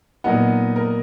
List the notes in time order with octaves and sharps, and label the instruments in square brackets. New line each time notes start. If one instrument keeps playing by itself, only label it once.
[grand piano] A#2 F#3 B3 [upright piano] D#4
[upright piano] A#4